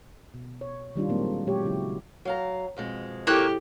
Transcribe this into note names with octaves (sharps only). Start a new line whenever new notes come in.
B2
C#5
D#3 G3 D4 F4
A#2 F#3 G#3 A#3 C4
A#2 F#3 G#3 G4 C#5
C#3 F#3 E4
F#3 F5 A#5
F2 B2 G#3
A#3 E4 G4 A4 C#5 G5 F#6